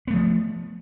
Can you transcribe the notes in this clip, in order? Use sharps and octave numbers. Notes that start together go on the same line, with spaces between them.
F3 A3 B3